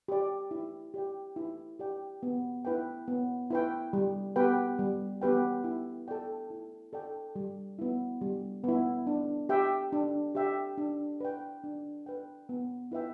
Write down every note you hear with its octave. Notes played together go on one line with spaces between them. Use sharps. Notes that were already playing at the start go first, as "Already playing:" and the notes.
G4 D5
E4
G4 D5 G5
E4
G4 D5 G5
B3
E4 B4 G5
B3
E4 B4 G5
G3
B3 G4 B4 G5
G3
B3 G4 B4 G5
E4
A4 D5 G5
E4
A4 D5 G5
G3
B3 E4
G3
B3 E4
D4
G4 E5 G5
D4
G4 E5 G5
D4
B4 D5 G5
D4
B4 D5 G5
B3
E4 B4 E5 G5